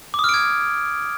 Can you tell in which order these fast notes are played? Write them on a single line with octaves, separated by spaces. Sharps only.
D6 D#6 F6 D7 G#6